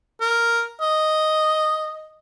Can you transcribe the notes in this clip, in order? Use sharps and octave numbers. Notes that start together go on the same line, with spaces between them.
A#4
D#5